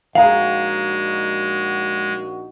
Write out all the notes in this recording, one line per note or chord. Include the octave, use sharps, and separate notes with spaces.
A#1 G#3 D#4 F#4 G#4 F5 A#5 F7